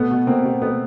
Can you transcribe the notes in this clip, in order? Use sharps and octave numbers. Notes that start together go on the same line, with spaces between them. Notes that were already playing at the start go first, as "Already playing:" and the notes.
Already playing: B2 A3 B3
B2
B2 A#3 C4
B2
B2 A3 B3